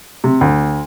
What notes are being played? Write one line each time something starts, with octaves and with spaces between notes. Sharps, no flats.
C3
D2